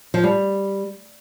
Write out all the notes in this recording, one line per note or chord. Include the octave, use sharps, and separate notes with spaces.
F3
G3